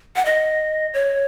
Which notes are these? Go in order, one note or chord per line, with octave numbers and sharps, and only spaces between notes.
F#5
D#5
C#5